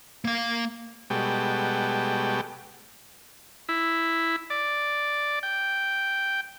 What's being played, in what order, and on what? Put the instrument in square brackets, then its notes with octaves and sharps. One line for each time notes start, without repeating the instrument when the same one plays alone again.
[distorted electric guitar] A#3 F5
[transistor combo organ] B2 G3 G#3 F#4 A4 G5
E4
D5
G5